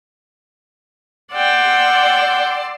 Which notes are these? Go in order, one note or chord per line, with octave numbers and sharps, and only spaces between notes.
D5 F#5 G5 C6 E6